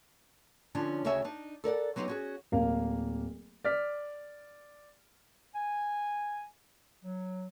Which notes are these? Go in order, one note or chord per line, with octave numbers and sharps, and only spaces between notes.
D3 F3 C#4 D4
D2 C#3 F#4 C#5 E5 G#5
D4 D#4
A4 A#4 D5 F#5
F#3 B3 C4 D4 D#4 G4
C#4 F#4 G#4
D1 A#3 F5
D5 F6 B6
G#5
F#3